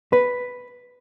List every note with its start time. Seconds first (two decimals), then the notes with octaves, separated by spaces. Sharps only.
0.13 B4